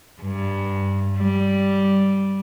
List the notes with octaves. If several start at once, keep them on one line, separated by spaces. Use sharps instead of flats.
G2
G3